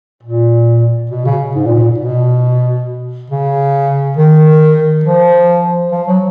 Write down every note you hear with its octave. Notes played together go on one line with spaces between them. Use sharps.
A#2
B2
C#3
G#2
A#2
A#2
B2
C#3
D#3
F3
F3
F#3